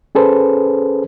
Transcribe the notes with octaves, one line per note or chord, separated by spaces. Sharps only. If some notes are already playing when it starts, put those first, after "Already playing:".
C#4 G#4 A4 B4 C5